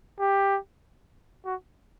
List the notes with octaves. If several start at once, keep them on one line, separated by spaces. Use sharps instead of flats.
G4
F#4